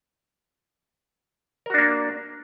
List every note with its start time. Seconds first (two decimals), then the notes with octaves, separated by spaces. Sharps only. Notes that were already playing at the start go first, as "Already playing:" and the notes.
1.66 A#4
1.70 F#4
1.74 D4
1.78 A#3